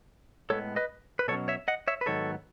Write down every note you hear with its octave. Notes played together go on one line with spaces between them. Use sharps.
A2 G#3 B3 A4 C#5
B4 D#5
B4
B2 F#3 C#4 A4 C#5
C#5 E5
D#5 F#5
C#5 E5
B4
G#2 D#3 F#3 B3 A4 C#5